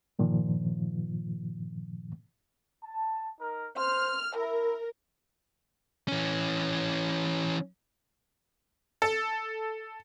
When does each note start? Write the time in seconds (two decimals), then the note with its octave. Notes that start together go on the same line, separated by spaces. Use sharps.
0.19 G2 A#2 D#3 F3
2.84 A5
3.40 D#4 A#4
3.77 C5 C6 F6
4.36 E4 A#4 E5
6.08 E3 C#4
9.02 A4